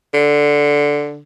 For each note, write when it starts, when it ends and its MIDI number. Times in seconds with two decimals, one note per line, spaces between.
0.14 1.20 50